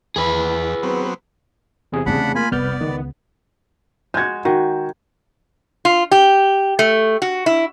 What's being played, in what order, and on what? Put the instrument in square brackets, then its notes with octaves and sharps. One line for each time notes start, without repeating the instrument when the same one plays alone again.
[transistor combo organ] E2 [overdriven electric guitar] G#4 B4
[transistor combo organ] F#3 B3 C4
[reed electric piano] E2 C3 G#4
[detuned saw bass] C#3 [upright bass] A3 C4 [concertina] D4 F#5 B5
[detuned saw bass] A#3 [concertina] F4 G#5 B5
[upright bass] F1 [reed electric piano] C2 F6 G6 [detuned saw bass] B3 [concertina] D5
[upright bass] C#2 [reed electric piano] D#3
[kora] G#3 F#4 [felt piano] G6 G#6
[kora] D#3 [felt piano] F#4
[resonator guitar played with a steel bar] F4
G4
A3
F#4
E4